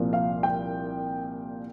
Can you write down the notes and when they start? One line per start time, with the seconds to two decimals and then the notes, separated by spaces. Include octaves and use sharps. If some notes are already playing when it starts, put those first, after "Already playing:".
Already playing: C2 A#2 F3
0.13 F5
0.43 G5